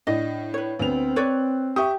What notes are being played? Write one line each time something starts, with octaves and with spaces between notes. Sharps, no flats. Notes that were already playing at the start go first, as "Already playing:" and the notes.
A2 D4 D#5
B4 C#5
D2 B3 C4 F7
B4 C#5 D5 F#6
G4 E5 C#6 D#6